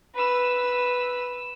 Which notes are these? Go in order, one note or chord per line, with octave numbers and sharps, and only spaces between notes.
B4 E6